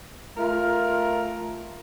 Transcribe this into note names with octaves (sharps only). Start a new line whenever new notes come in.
A3 F4 A#4